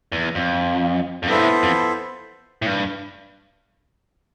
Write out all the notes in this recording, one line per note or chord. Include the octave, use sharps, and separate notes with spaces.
E2
F2
F2
G2 B3 E4 A4 C5 E5
A2
F2
A2
G2